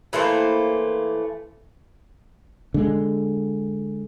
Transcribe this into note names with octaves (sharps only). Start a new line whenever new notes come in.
E3 A3 A#3 C5
D3 G#3